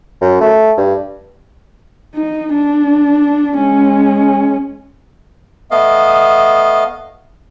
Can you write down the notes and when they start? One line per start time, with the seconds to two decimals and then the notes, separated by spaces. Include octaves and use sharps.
0.21 F#2
0.41 A3
0.78 G2
2.15 D#4
2.54 D4
3.56 G#3 C#4
5.71 A3 B3 D#5 F5